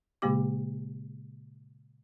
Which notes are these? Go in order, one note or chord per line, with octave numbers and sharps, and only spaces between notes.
A#2 C#3 G#3 A#3 G4 D6